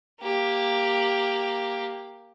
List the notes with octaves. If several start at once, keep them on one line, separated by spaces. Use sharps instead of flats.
A#3 G4